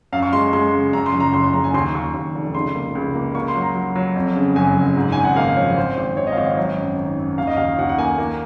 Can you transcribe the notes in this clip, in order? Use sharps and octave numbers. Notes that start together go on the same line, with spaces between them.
F#2 F5
C#6
G#3 C6
G#3 C6
C#3
F#2 A#5
C6
F#1
A#5
F#1 C6
C6
F#1 A#5
G#5
D#2 C6
D#2 C#6
D#2
F1
C#2 C6
A#3
C#2
A#3
A#3 C#6
C6
F#3
A#5
F#3
F#3
F2
C#3
F#1 G#5
F#1
G#2
G#1 G#5
F#5
A#3 F5
F3 C#5
G#1 C5
G#1
G#1 C#5
D#5
F5
G#1 D#5
F#3 C#5
F#2
D#3
F#2
D#2 F5
D#5
D#2 F5
D#2 F#5
F#5
A#3 G#5
A#3